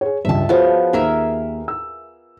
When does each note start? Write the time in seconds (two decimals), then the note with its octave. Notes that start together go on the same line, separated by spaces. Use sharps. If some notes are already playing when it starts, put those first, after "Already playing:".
0.01 G#4 C#5
0.25 C#2 G2 E5 A5
0.49 F3 B3 F#4 G#4 C#5
0.93 D#2 G#4 A#4 E5
1.68 E6